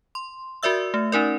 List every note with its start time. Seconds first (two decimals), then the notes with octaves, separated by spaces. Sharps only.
0.15 C6
0.63 F#4 A#4 D5 E5 E6
0.94 A3
1.12 C#4 D#4 A#4 D5